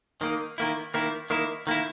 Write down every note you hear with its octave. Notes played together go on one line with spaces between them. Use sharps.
D#3 A#3 D#4
D#3 A#3 E4
D#3 A#3 E4
D#3 A#3 E4
D#3 A#3 E4